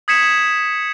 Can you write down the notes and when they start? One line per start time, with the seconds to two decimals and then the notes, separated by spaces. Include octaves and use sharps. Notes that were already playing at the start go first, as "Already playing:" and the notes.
0.08 D#6 G#6 B6 C#7 E7